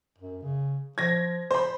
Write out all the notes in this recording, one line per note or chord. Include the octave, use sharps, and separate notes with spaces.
F#2
C#3
F3 G#6 A#6
C5 B5